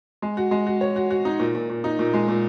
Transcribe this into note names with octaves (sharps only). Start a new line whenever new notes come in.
G#3
F#4
G#3
F#4
C#5
F#4
F#4
D#4
A#2
A#2
A#2
D#4
A#2
G#3
A#2